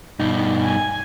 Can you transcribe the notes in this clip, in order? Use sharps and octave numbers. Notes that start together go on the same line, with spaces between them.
G2 B2 D#4
G#5